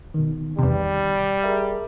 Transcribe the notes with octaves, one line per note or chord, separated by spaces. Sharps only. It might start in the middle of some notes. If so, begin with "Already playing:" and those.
B2 D#3
E2 C3 G3
G#4 A#4 E5